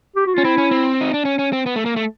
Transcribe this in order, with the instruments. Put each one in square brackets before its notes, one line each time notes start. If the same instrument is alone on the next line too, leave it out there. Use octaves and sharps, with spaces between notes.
[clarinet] G4
F#4
[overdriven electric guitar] C#4 [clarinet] F4
[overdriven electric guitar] C4 [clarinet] E4
[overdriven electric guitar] C#4
C4
D#4
D4
C#4
C#4
C4
B3
A3
A#3
A3